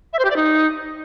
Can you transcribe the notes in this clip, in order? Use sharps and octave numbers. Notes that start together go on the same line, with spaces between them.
E5
C5
G4
D5
D#4